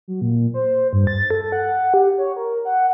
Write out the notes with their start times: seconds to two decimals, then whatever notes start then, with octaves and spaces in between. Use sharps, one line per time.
0.08 F#3
0.21 A#2
0.54 C5
0.93 G2
1.07 A6
1.30 A4
1.52 F#5
1.94 G4
2.18 C#5
2.36 A#4
2.65 F#5